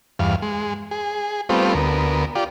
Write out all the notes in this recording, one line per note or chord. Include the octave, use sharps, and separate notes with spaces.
E2 G2 F5
G#3
G#4
G3 A3 B3 C4 F4
D2 B3 A#4
F4 G4 D5